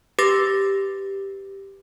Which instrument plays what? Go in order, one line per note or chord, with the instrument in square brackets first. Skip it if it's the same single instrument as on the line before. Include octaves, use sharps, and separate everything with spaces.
[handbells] G4 B4 D6 A6 A#6